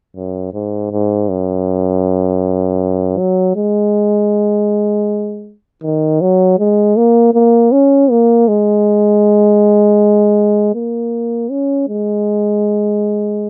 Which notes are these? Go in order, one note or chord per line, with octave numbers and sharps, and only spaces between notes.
F#2
G#2
G#2
F#2
F#3
G#3
D#3
F#3
G#3
A#3
A#3
C#4
A#3
G#3
A#3
C#4
G#3